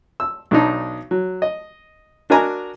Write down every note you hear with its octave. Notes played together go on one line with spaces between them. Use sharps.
E6
B1 D4 D#4
F#3
D#5
D4 F#4 A#4 D#5 G#5 A#5